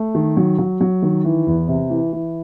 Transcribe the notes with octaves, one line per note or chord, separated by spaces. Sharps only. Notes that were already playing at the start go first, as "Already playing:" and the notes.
Already playing: A3
D#3
F#3
F#3
F#3
D#3
E3
E2
C3
E3
E3